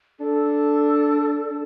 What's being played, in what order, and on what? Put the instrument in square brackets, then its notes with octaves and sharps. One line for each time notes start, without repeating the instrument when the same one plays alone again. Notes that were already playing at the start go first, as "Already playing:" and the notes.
[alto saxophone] D4 [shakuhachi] A4
[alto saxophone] D4